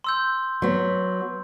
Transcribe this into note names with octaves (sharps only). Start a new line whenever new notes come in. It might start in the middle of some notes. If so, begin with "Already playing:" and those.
C6 E6 G6
F#3 B3